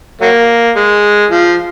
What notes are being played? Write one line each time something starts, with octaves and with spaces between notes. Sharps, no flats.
F#3 A#3
G#3
F3